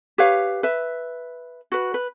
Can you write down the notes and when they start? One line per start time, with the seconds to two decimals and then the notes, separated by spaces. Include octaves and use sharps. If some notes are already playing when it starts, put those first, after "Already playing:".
0.18 G4 B4 C#5 F5
0.63 B4 E5
1.72 F#4 B4
1.94 B4